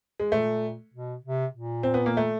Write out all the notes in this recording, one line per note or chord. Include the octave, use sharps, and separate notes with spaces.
G#3
A#2 A3
B2
C3
A#2
C4
B3
A#3
A3